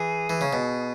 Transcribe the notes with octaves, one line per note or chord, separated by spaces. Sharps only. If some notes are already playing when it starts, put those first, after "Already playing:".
Already playing: E3 G#4
E3
C#3
B2